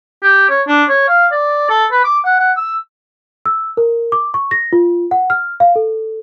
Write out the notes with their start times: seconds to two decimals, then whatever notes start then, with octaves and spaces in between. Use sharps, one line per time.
0.23 G4
0.50 C#5
0.67 D4
0.89 C#5
1.08 F5
1.31 D5
1.70 A4
1.92 B4
2.04 D6
2.25 F#5
2.39 F#5
2.57 E6
3.46 E6
3.77 A#4
4.12 D6
4.34 C#6
4.51 A#6
4.73 F4
5.11 F#5
5.30 F6
5.60 F5
5.76 A4